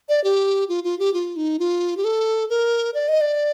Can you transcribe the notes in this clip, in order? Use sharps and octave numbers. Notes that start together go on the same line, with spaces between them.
D5
G4
F4
F4
G4
F4
D#4
F4
G4
A4
A#4
D5
D#5
D5